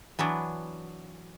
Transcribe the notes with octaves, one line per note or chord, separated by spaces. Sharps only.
E3 F#3 B3 D4